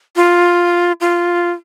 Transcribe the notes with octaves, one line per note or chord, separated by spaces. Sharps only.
F4
F4